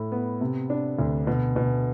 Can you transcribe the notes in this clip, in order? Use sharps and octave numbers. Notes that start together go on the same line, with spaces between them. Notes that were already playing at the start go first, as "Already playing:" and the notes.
Already playing: A2
B3
C3
D4
D2
B2
B2